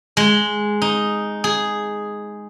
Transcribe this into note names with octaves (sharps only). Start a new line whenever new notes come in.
G#3
D#4
G#4